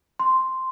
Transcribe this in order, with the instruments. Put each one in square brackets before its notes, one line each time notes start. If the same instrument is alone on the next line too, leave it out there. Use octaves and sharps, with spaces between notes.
[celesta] C6